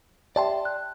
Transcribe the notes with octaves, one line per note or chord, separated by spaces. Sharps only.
G4 D5 E5 G5 A5 C6
F#6